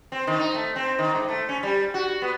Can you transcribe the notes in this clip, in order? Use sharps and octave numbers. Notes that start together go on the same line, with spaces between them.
C4
D#3
D#4
A3
C4
D#3
G#2
A3
C#4
G3
F#4
B3